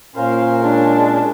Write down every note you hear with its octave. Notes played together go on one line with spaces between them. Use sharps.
A#2 C#4 A#4 C5 F5
G#3 D4